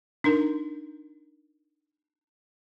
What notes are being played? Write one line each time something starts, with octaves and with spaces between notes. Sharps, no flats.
D4 D#4 A#4